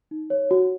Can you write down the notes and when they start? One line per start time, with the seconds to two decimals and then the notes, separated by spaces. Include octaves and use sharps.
0.11 D#4
0.30 C#5
0.51 F#4